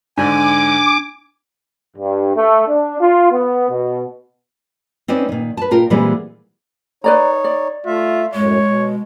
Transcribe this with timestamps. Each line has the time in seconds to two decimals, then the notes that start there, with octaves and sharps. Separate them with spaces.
0.18 G#2 D3 D4 G#5 D6
1.97 G2
2.36 A3
2.69 D4
3.01 F4
3.32 B3
3.70 B2
5.08 C4 C#4 D#4 B4 D5
5.29 A#2 D#3
5.57 B4 A5
5.71 A#2 F4 A#4 G5
5.90 A#2 E3 G3 G#3 B3 C4
7.04 D#4 B4 C#5 D5 A#5
7.44 D5
7.86 A3 F4 E5
8.34 F#2 A2 G#3 C#5
8.65 B2